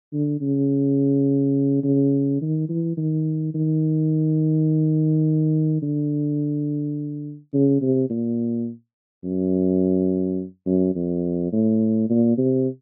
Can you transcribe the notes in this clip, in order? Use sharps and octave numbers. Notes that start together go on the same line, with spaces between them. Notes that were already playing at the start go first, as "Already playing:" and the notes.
D3
C#3
C#3
D#3
E3
D#3
D#3
D3
C#3
C3
A#2
F#2
F#2
F2
A2
A#2
C3